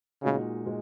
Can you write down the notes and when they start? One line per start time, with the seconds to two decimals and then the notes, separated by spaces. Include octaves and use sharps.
0.23 A#2 C#3 G#3 D#4 F#4
0.65 A#2 G#3